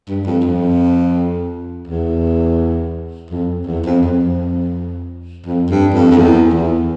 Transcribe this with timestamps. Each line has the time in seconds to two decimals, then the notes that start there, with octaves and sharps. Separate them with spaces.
0.09 G2
0.26 F2
0.44 F2
1.88 E2
3.31 F2
3.67 E2
3.86 F2
4.03 F2
5.46 F2
5.70 G2
5.94 F2
6.11 F2
6.18 E2
6.54 E2